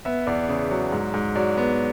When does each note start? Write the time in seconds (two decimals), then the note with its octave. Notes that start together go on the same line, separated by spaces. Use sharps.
0.05 B3 E5
0.27 E2 D5
0.49 C#3
0.71 F#3
0.92 G#2
1.14 G#2
1.35 F#3 D5
1.57 B3